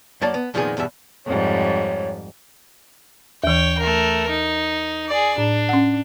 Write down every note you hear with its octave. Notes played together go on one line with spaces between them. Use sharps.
F#2 F#3 A#3 D5 A5
B3
F2 A#2 D#3 F3 B3 G#4
E2 G2 B2 E5
F2 G#2 G3 C#5
D#2 E3 C#5 G5
A3 A#4
D#4
G#4 D5
A2 D4
C#4 F#5